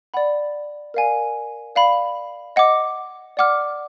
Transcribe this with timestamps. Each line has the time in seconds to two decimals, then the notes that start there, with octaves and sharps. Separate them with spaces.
0.14 D5 F#5 B5
0.94 A#4 D5 F5 G#5
1.76 D5 F5 B5
2.56 D#5 F#5 D6
3.37 D5 F#5 D6 F6